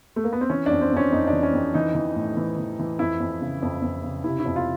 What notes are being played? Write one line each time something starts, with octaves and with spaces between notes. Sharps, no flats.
A3
A#3
B3
C4
E3 C#4
F2 D4
C4
F2 C#4
F2 D#4
D4
E3
C#4
F2
E3 D#4
E3
A2
E3
E3
E3
F2 E4
F2
C#3
F2
F2
C#3
C3 E4
E4
F2
F4